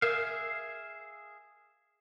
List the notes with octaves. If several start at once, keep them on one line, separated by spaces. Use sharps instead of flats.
G#4 A#4 E5 F5